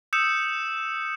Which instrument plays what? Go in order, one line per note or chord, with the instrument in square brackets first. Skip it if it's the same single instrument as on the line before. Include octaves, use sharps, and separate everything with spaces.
[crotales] D#6 E6 G6 C#7 E7